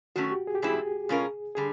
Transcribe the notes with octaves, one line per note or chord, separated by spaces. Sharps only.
D#3 F#3 A3 C#4 F#4
G4
G#4
G4
G#2 E3 G3 C4 E4 G#4
B2 G#3 C#4 F4 A#4
D3 G3 G#4